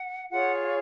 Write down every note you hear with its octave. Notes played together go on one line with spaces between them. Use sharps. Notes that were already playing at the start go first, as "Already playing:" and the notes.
Already playing: F#5
F4 G#4 C#5 F#5